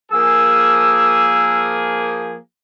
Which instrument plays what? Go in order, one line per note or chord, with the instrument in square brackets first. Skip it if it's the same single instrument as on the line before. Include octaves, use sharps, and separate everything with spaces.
[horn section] F3 A#3 G#4 [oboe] E6